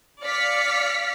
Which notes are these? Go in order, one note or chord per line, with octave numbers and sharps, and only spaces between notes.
D5 F5 F6 B6 C#7